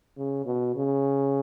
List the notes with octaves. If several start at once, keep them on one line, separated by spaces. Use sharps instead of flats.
C#3
B2
C#3